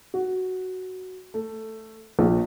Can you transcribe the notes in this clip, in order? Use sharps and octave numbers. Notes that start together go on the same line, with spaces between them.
F#4
A3
A#1